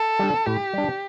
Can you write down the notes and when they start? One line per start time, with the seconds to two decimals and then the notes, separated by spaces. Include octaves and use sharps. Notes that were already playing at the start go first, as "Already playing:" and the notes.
Already playing: A4
0.19 G3 D4
0.46 A2 G4
0.73 G3 D4